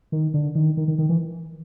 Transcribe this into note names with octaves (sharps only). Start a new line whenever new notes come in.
D#3
D3
D#3
D#3
D#3
D#3
E3